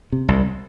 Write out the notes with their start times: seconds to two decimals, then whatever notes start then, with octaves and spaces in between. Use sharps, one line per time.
0.12 C3
0.28 C2